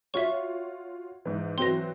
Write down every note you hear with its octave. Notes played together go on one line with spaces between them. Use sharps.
F4 F#4 C#5 E5 C#6
G#2 E3
E3 F#3 C4 C6 A#6